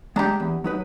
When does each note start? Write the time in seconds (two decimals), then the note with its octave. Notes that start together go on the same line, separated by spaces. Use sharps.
0.16 G#3 D4 G4 A#5
0.40 E2
0.64 F#3 D#4 B4